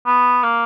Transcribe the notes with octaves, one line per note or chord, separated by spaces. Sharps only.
B3
A#3